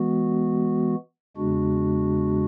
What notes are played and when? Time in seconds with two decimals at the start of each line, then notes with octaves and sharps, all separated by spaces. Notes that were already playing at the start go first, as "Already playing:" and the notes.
Already playing: E3 G#3 B3 F#4
1.37 E2 C#3 G#3 D4 F#4